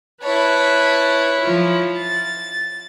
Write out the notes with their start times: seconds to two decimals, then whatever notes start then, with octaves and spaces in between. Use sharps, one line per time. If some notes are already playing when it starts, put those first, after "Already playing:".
0.23 E4 B4 C#5 A5 B5
1.41 F3 F4
1.97 A6